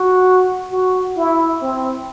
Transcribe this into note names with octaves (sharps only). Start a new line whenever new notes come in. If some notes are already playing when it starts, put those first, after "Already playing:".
Already playing: F#4
F#4
E4
C4